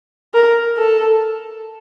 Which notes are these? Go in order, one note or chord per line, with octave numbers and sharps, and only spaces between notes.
A#4
A4